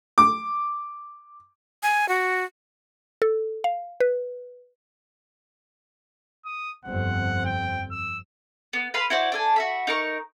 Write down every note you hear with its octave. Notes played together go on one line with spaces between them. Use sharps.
D6
G#5
F#4
A4
F5
B4
D#6
G1 F2 C4 F#5
G5
E6
B3
B4 F5 B5 C6
E4 F#4 C5 D5
D4 A4 G#5
F#4 E5 B5
D#4 A#4 C#6